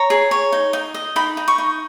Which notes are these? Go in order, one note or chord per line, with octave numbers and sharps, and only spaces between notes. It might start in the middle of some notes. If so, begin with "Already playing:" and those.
Already playing: C#5 A#5
G#4
C#5
D#4
D#4
D#5
D#4 B5
D#4
C#6
D#4